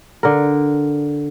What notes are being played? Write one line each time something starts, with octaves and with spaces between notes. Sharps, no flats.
D3 A#4